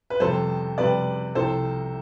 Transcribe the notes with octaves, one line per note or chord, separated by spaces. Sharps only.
B4
F2 C3 G3 A4 C5
F2 C3 G3 B4 D5
C2 C3 F3 A4 C5